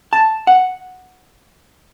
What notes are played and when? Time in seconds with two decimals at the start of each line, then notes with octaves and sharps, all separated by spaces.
0.13 A5
0.47 F#5